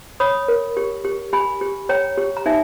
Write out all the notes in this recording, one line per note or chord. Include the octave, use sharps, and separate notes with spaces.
C#5 B5 D#6
A#4
G4
G4
G4 G#5 B5
G4
C#5 G5 A#5
G4
A#5
D#4 E5 G#5